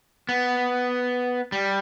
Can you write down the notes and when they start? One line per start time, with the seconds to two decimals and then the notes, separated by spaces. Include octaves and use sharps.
0.29 B3
1.52 G3